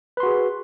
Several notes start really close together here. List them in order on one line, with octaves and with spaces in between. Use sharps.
B4 C6 F#4 G#4